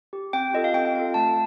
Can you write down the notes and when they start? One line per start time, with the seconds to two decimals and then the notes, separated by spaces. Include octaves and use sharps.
0.13 G4
0.33 C4 G5
0.54 F4 A4 D#5
0.64 F5
0.74 C4 G5
0.85 G5
0.95 F4 A4 F5
1.14 A3 A5